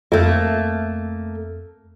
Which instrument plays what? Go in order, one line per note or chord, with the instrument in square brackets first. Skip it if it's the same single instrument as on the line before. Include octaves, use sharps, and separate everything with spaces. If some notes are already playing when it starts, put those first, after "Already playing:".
[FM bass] F2 [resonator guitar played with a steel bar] A3 A#3